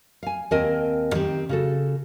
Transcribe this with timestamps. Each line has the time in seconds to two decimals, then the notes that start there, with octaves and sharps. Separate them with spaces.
0.23 F5 G#5
0.51 D#2 C4 A#4 D#5 G#5 A5
1.14 D#3 C4 G4
1.49 C#3 F#4 A4